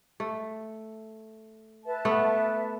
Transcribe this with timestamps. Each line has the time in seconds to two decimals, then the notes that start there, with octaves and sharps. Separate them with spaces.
0.20 A3
1.85 B4 E5 A5
2.05 A3 B3